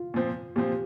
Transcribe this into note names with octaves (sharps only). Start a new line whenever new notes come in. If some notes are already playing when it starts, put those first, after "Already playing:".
Already playing: F4
A#2 F3 C4
A#2 F3 C4 G4